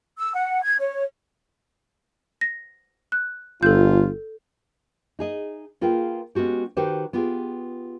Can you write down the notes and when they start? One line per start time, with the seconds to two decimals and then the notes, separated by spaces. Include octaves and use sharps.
0.19 E6
0.34 F#5
0.63 G#6
0.79 C#5
2.41 A#6
3.12 F#6
3.63 G1 F4 A4 G6
5.19 D#4 G#4 D#5
5.81 A#3 F4 G#4 B4 G5
6.35 G#3 B3 C#4 F#4 G4
6.77 D#3 F#4 G4 B4 C5
7.13 B3 F4 G4 G#4